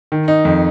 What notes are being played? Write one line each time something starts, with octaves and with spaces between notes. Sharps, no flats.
D#3
D#4
F2